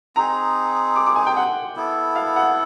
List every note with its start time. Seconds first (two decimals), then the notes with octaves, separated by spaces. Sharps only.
0.16 C4 D#4 G#4 A#5
0.96 D6
1.06 D6
1.16 G#5
1.27 G5
1.36 F#5
1.76 B3 E4 A4
2.15 F5
2.36 F#5